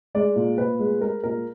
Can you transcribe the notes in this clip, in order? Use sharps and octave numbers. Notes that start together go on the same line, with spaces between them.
G#3 D5
A#2
A#2 B4
G#3
G#3 A#4
A#2 A#4